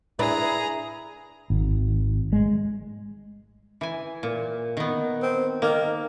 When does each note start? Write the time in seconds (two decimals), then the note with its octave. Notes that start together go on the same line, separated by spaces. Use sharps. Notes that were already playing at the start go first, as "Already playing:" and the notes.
0.19 D4 E4 G#4 B4 A#5
1.50 G#1
2.33 G#3
3.81 E3 G#5
4.23 A#2
4.77 D#3 B3
5.22 C4
5.62 D#3 A#3